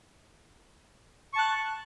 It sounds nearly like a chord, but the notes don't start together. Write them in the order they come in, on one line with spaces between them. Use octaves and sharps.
C#6 A5 F#6